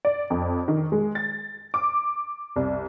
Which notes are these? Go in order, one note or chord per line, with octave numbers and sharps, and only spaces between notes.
D5
F2
D#3
G#3
A6
D6
C2